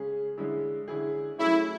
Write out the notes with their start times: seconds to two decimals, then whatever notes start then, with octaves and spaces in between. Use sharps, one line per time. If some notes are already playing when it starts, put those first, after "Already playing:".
Already playing: C#3 G#3 C#4 G#4
0.37 D3 G#3 C#4 E4 G#4
0.88 D3 G#3 C#4 E4 G#4
1.38 F#3 A3 C#4 E4 G#4 C#5